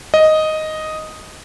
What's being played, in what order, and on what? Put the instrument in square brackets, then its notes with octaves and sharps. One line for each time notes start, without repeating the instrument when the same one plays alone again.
[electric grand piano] D#5